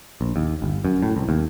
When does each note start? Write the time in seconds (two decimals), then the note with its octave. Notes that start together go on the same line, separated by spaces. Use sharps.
0.21 A#1
0.36 D#2
0.62 G1
0.85 F#2
1.02 A2
1.16 C2
1.29 D#2